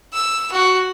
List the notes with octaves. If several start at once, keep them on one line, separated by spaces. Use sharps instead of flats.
E6
F#4